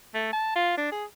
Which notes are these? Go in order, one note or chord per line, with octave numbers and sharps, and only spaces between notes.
A3
A5
F4
D4
G#4